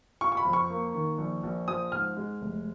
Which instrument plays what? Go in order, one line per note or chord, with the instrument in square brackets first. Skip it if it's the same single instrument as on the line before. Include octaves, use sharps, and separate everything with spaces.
[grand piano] F4 C#6
C#6
B5
F2
C#6
A#3
D#3
A#1
A#1
F3 D#6
G#2 F6
G#3
F1